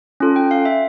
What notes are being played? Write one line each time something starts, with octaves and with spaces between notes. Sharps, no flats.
C#4 F4 A4
G5
F5
E5